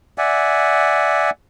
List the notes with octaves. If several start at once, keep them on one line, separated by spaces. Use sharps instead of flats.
D5 E5 F#5 G#5